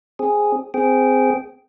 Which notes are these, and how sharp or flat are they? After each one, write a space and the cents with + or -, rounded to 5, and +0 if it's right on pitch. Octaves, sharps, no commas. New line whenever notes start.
C4 +10 G#4 +0
C4 -15 G#4 +0 G5 -15